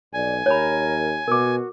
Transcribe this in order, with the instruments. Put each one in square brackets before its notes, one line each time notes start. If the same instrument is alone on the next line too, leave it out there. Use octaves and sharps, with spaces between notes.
[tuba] B1 [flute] D5 [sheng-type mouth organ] G#5
[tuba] D#2 [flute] A#4 [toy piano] C#5 B5
[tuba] B2 [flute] F#4 [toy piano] A#4 D6